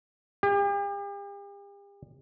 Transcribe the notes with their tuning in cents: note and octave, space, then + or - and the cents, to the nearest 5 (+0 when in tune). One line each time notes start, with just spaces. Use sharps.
G4 +40